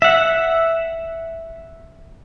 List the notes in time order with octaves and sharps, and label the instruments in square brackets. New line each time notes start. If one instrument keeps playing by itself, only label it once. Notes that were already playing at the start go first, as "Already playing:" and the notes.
[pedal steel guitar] E5 F#5